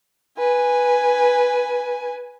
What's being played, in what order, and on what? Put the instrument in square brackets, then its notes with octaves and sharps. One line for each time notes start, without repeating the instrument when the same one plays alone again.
[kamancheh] B4 G#5